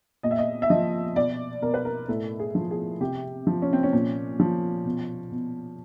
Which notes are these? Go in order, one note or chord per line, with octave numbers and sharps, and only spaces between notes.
A#2 D#5
E5
D#5
E5
F3 D#5
B2 D5
B2 A#4
B4
A#4
A2 A4
G#4
F3
G#4
C3 G4
F3
C#4
C4
C#4
A#2
F3
B2
B2